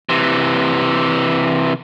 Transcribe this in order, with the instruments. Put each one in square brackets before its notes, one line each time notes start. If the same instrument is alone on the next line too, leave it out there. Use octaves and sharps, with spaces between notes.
[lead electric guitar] C3 E3